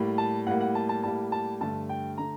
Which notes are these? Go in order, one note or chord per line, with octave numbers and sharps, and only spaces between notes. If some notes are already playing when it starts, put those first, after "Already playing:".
Already playing: A2 G3 A#3
A5
A2 G3 A#3 F#5
F#5
A5
A5
A2 G3 A#3 A5
A5
G2 D3 A3 A5
G5
D3 A3 A#5